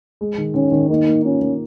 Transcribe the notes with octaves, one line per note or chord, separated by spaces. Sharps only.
G#3
D#3
D#3 C#4
D#3
A#3 D#4
A#3
C#4 F4
A#3